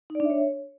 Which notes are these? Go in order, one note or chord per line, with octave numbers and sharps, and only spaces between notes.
D#4
D5
D4
E5
C#5